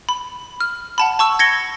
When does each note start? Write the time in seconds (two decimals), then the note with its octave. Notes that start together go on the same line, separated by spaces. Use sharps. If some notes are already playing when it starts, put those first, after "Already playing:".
0.09 B5
0.60 F6
0.98 F#5 A5 B5
1.19 A5 C#6 E6
1.39 G#6 A#6 C#7 G7